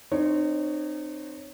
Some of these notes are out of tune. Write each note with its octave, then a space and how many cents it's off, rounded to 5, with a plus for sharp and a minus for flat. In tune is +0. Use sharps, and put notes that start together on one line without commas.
C4 +0 D#4 -35 C#5 +0